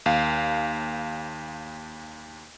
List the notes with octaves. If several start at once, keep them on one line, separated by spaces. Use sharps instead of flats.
D#2 F5